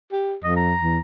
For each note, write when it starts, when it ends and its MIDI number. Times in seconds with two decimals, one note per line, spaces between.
0.12 0.35 67
0.44 0.74 41
0.44 0.54 75
0.57 0.99 82
0.81 0.99 40